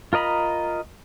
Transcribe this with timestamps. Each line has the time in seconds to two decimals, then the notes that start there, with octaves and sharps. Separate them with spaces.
0.13 F4 A#4 D#5 A#5 B5